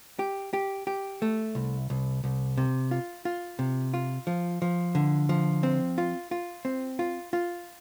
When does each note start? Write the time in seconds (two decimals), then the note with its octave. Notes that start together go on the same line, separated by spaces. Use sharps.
0.19 G4
0.53 G4
0.87 G4
1.22 A3
1.55 C2
1.90 C2
2.24 C2
2.57 C3
2.91 F4
3.25 F4
3.59 C3
3.94 F4
4.27 F3
4.62 F3
4.95 D3
5.29 F3
5.63 C4
5.98 F4
6.31 F4
6.65 C4
6.99 F4
7.33 F4